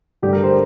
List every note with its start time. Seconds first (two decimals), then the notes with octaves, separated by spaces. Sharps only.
0.22 G2 D3 G3 G4
0.33 A#4
0.44 C5